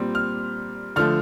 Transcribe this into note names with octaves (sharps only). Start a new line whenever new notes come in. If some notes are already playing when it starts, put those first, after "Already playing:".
Already playing: A#2 G3 C4
F6
D3 F3 A3 F6